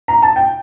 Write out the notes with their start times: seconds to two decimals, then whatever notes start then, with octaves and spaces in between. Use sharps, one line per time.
0.08 A#5
0.22 A5
0.36 G5